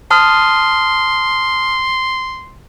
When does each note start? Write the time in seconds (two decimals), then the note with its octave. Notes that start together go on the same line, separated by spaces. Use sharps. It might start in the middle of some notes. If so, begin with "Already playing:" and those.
0.11 A5 C6 D#6 F6